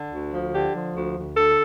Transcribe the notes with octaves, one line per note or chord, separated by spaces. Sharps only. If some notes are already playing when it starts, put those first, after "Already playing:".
Already playing: D3
D2
F3
D3 G4
F3
D2
D2
D3 A4